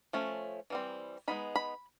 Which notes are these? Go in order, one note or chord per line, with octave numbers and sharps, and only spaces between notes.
F3 A3 C#4
E3 G3 C4
G#3 B3 D#4 B5
B5